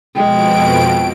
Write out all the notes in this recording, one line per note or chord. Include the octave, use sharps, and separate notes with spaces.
F2 B2 G#3 G5 D7